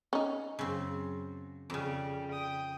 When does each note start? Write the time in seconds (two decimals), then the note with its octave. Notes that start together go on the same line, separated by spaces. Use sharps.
0.13 C#4 D#4
0.59 F#2 C#3 C4
1.70 F2 C#3 G3
2.31 G5 D#6